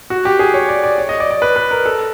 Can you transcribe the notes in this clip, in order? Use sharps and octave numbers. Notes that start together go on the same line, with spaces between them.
F#4
G4
G#4
C#5
D5
D5
C#5
D#5
D5
D5
B4
B4
A#4
A4